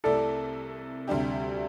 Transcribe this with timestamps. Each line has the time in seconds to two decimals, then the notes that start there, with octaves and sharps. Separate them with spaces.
0.04 C2 C3 A3 E4 A4 D5
1.08 D2 C3 G3 D4 G4